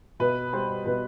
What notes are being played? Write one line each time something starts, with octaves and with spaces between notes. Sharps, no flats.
B2 B4
G3 C5
B2 B4